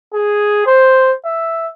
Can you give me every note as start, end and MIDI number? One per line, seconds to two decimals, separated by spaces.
0.14 0.64 68
0.67 1.12 72
1.26 1.69 76